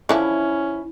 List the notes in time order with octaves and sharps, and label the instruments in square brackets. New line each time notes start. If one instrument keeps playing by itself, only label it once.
[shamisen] D3 E3 F3 [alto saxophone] C#4 [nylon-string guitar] E4